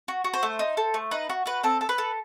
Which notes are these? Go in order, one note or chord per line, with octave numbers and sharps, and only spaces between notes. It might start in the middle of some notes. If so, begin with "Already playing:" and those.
F#4
F#4
C5
A3
D#4
A4
A3
D#4 B4
F#4
F#4 B4
C4 A4
A4
B4
A4